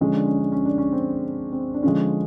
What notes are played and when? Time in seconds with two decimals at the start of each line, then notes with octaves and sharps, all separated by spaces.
0.01 D3 F3 G#3 C#4
0.13 D4
0.26 C#4
0.39 D4
0.52 C#4
0.65 D4
0.78 C#4
0.92 C4
1.52 C4
1.74 D4
1.83 D3 F3 G#3 C#4